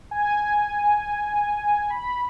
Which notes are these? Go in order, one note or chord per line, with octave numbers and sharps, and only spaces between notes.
G#5
B5